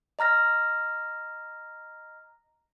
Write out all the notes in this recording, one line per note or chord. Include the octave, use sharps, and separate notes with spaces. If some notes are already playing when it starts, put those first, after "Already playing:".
D#5 A#5 F6 A#6